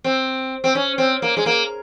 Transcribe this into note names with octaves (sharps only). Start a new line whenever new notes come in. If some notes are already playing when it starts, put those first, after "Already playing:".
C4
C4
C#4
C4
A#3
G#3
A#3